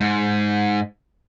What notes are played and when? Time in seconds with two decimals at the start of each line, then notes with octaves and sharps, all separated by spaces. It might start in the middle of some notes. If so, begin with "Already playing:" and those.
0.01 G#2